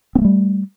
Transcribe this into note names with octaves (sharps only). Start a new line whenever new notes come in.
G3 A3 A#3 C4